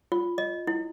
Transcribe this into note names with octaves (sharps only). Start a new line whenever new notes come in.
F4
D#5
E4